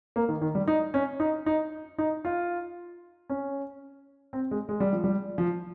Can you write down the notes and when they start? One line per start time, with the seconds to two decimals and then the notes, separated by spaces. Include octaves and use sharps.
0.16 A#3
0.29 D#3
0.41 D#3
0.55 G3
0.68 D#4
0.94 C#4
1.20 D#4
1.46 D#4
1.98 D#4
2.25 F4
3.29 C#4
4.33 C4
4.51 G#3
4.69 G#3
4.80 G3
4.93 F3
5.04 G3
5.38 F3